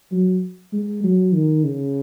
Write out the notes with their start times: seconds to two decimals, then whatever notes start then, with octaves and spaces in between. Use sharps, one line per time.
0.12 F#3
0.73 G#3
1.03 F#3
1.34 D#3
1.64 C#3